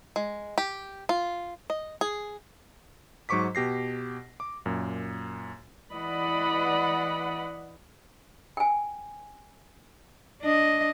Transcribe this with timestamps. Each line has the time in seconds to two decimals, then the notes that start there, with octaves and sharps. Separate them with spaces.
0.16 G#3
0.58 G4
1.09 F4
1.70 D#5
2.01 G#4
3.29 G#2 F#3 C5 C#6 D6 B6
3.55 B2 G4 A#6 C7
4.40 D6
4.66 F#2 A#2
5.92 E3 D5 D#5 F#5 B5
8.57 G5 G#5
10.43 D4 D#5